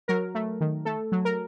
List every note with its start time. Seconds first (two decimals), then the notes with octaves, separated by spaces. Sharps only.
0.08 F#3 A#4
0.35 A3
0.61 D#3
0.85 A3 A4
1.12 F#3
1.25 A#4